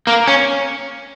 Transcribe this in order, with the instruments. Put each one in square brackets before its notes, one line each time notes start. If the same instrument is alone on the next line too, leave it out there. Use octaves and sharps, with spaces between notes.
[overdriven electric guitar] A#3
C#4